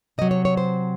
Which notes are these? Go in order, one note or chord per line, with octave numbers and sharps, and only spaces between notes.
C3 F#3 D#5
C#5
C#5
C5